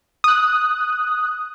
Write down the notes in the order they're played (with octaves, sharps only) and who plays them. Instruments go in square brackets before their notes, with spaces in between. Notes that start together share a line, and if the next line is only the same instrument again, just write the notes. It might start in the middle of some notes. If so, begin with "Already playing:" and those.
[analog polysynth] D#6 F#6